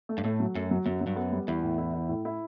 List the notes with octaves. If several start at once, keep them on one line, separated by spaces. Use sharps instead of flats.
A3
G2
A2 A3
F#3
F#2 A3
F#3
F#2 F#3
F#3
G2
F#2 B3
G3
E2 E4
A2
E4
E4
A2
E4